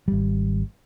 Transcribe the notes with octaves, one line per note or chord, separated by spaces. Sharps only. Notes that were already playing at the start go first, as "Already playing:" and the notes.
G#1 G3